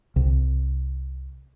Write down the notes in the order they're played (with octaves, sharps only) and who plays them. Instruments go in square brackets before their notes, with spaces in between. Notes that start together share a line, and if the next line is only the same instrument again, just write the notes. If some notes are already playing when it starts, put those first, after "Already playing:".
[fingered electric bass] C2